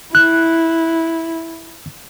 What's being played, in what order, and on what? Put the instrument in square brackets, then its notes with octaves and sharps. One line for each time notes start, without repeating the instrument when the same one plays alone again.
[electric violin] E4 [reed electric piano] F#6